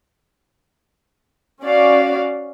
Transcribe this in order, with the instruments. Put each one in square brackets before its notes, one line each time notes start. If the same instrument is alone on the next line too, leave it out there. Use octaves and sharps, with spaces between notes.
[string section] C#4 F#4 D5 F5